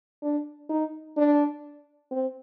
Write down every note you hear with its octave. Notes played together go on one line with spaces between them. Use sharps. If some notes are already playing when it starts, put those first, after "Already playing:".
D4
D#4
D4
C4